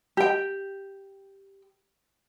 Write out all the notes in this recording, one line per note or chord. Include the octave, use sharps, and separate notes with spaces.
G4 G5